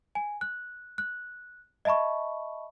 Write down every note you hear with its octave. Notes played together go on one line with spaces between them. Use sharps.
G#5
F#6
F#6
D#5 E5 A5 B5 C#6